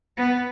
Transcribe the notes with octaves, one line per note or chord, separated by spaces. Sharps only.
B3